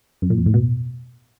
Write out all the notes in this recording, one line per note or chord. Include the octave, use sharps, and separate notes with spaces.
F#2
A#2
F2
A2
B2